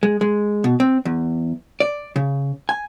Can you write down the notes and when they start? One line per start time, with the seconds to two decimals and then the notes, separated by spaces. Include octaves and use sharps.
0.03 G#3
0.21 G#3
0.64 B2
0.80 C4
1.05 E2
1.80 D5
2.16 C#3
2.69 G#5